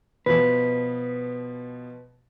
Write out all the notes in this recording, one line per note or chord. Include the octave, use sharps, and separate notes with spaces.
B2 F3 B4